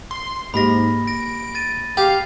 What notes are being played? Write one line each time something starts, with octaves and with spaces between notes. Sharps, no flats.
C6
G#2 A#3 G4 D#5 B5 A#6
A#6 D7
A6 D#7
G4 F5